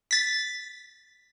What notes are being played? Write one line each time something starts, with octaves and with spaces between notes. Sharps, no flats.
A6 B6